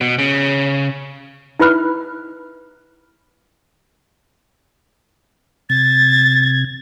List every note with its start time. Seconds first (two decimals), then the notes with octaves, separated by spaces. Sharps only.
0.01 B2
0.19 C#3
1.60 D#4 E4 B4 B5 F6 F#6
5.70 C3 G#6 A6